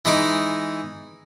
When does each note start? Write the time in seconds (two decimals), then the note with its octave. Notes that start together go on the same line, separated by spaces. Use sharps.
0.05 E3 G#3 D#4 D6